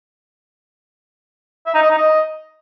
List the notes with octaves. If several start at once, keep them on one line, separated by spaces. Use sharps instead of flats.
E5
D#4
D#5
D#4
D#5